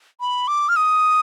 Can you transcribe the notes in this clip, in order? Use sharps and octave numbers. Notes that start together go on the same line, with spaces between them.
B5
D6
F6
D#6